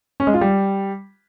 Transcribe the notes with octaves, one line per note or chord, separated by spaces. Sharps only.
C#4
G#3
F4
G3